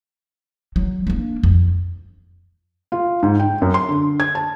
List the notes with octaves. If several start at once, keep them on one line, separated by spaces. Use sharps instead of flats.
F#3
A#3 D4
F2
F4
G#2
G5
F#2
C6
D3
G#6
A5